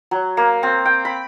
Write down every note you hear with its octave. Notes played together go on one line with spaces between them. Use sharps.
F#3
A#3
C4
G5
B5